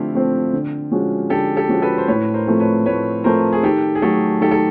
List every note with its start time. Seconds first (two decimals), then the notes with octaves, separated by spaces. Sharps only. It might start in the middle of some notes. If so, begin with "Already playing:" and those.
Already playing: D3 F3 A3 C4 E4 F4 G4
0.14 F3 A3 C4
0.53 D3
0.91 F3 G#3 C#4 F#4
1.30 D3 G4 A4
1.56 G4 A4
1.69 F3 G#3 C#4 F#4
1.82 A4 B4
1.98 C5
2.08 A2 B4 C#5
2.34 A#4 C5
2.47 F3 A3 C4
2.60 B4 C#5
2.86 A2 B4 C#5
3.24 F3 A3 C4 A#4 C5
3.53 G#4
3.63 D#3 G4 A4
3.95 G#4
4.02 F#3 A3 G4 A4
4.41 D#3 G4 A4
4.51 A4